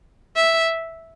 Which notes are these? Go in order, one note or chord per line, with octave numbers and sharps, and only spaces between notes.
E5